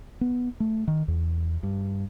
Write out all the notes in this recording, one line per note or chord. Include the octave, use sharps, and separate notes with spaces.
B3
A3
D#3
E2
G2